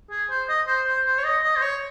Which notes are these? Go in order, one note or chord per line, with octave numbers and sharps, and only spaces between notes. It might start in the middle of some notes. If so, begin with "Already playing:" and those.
G#4
C5
D#5
C5
C5
C5
C#5
D#5
D#5
C5
C#5